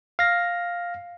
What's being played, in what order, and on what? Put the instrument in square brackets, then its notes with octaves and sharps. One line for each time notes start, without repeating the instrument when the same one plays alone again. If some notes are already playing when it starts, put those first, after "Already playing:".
[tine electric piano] F5 A#6